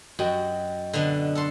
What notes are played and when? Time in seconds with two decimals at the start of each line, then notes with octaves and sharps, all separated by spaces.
0.19 F#2 F#4 D#5 G5
0.93 B2 D3
1.35 A4 C6